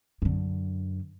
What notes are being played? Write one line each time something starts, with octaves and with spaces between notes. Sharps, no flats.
F#2 D3